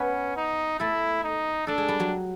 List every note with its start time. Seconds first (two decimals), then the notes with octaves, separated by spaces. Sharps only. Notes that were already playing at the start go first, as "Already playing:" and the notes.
Already playing: B3 C#4 B4
0.36 D#4
0.80 A3 E4 A4
1.24 D#4
1.67 A3 D4 A4
1.78 G#3 G#4
1.88 G3 G4
2.00 F#3 F#4